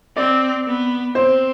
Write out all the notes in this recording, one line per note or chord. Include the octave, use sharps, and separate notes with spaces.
C4 D5
B3
C4 C5